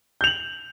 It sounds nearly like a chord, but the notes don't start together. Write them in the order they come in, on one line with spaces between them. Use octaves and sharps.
G6 F7 F#7